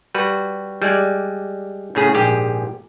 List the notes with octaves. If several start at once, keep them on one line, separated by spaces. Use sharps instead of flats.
G3 F#4 B4
G3 G#3 D5
A2 C#3 G#4
A#1 G#2 G4 G#4